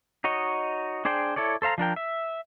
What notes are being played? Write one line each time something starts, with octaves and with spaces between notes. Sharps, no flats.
D#4 F#4 C#5 D#5
D4 G#4 C5 D5 G5
E4 A4 C#5 D5
A4 C5 F5 A#5
F3 D4 A#4 G5
E5